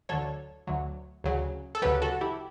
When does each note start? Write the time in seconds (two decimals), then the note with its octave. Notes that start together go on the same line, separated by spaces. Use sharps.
0.09 D2 D3 F#3 A4 C#5
0.67 D2 D3 F#3
1.24 D2 C#3 F#3
1.75 A4
1.82 D2 C#3 F#3 G4 B4
2.02 F#4 A4
2.21 E4 G4